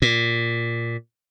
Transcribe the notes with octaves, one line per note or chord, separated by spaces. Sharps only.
A#2